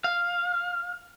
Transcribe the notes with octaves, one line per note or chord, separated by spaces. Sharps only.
F5